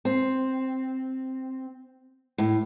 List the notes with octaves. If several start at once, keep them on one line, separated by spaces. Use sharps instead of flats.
C4
A2